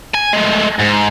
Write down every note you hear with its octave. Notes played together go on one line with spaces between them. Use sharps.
G#5
G#3 A3
G#2